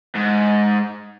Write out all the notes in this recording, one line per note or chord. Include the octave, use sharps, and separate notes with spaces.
G#2